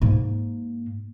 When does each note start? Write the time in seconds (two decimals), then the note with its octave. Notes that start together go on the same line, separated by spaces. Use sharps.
0.01 G#2 A#3